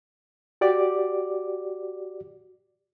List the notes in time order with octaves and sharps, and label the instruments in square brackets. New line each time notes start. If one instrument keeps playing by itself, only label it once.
[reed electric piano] F#4 G4 D5 D6